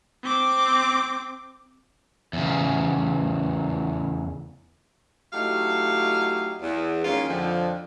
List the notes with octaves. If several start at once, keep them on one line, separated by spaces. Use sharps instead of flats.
C4 D6
E2 C#3
F#3 A3 D#4 E4 G4 F5
E2
D#3 G#3 A#3 C#4 F4
F2 D3 F3